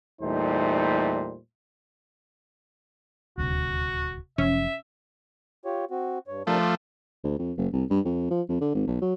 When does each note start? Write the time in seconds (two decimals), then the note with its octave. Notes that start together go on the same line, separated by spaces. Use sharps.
0.22 E2 A#2 G3 A3 D#4 C5
3.38 D#1 D2 C3 F#4
4.38 F#1 C3 F3 C#4 E5
5.65 F4 G4 C#5
5.91 C4 F#4
6.28 G2 C#5
6.47 C3 F3 A3 D4 A#4
6.61 C6 D6 F6
7.24 D2
7.38 F2
7.57 F#1
7.73 C2
7.90 G2
8.05 F2
8.30 F3
8.49 F2
8.61 D3
8.75 G#1
8.87 B1
9.01 F#3